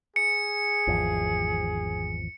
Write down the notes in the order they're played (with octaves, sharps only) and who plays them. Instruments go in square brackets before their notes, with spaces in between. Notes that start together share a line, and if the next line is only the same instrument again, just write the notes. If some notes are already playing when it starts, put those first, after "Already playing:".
[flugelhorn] G#4 [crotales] C#7
[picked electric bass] G#1 E2 F3